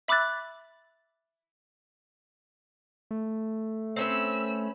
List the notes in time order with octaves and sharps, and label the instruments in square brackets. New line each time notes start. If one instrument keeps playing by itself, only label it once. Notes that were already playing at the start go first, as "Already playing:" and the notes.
[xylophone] E5 B5 D6 E6 F#6 A6
[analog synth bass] A3
[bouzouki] C4 C#4 B4 [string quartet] E6